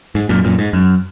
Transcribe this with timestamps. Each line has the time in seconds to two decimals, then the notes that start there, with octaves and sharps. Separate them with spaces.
0.15 G#2
0.29 F#2 A#2
0.44 F#2 A#2
0.59 G#2
0.73 F#2